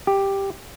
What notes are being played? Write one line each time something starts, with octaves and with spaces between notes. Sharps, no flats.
G4